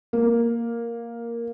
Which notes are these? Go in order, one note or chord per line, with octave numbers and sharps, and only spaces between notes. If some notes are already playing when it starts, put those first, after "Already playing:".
A#3